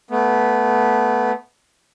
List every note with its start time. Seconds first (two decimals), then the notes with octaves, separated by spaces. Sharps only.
0.11 A3 B3